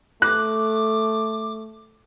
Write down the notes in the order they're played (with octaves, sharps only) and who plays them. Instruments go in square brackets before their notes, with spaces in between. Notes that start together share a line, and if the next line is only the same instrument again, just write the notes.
[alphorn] A3 [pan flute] D6 [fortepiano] F#6